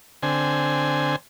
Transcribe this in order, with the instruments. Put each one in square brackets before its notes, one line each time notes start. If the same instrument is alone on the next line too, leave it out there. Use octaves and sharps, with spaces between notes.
[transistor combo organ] D3 C4 G#5